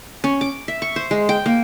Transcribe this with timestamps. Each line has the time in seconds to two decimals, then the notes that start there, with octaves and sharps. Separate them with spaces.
0.24 C#4
0.41 D6
0.68 E5
0.82 C#6
0.96 C5
1.11 G#3
1.29 G5
1.46 A#3